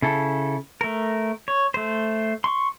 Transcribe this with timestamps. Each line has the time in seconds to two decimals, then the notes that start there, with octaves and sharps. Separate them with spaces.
0.02 C#3 E4 A4
0.81 A3 A#4
1.48 C#5
1.74 A3 C5
2.44 C6 C#6